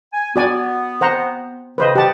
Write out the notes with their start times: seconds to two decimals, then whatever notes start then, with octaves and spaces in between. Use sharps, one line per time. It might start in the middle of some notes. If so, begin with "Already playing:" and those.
0.13 G#5
0.36 B3 F#4 D5 G#5
1.01 C5 F#5 A#5
1.78 C#3 B4 C5 D#5
1.96 G4 D#5 F#5 A5